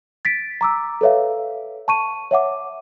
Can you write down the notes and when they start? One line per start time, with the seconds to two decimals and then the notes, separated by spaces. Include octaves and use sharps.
0.25 A6 B6 D7
0.61 A#5 D6 E6
1.01 A4 B4 C#5 E5 F5
1.88 A5 C#6 D#7
2.31 C#5 E5 F#5 D6